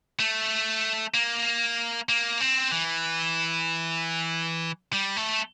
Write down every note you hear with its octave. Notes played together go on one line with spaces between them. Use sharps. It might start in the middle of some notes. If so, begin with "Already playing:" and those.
A3
A#3
A#3
C4
E3
G3
A3